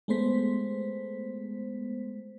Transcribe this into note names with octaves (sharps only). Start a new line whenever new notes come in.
G#3 A3 B3 C5 B6